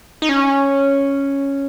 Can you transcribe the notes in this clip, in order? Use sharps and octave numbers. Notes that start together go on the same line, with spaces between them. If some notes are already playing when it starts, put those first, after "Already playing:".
D#4
C#4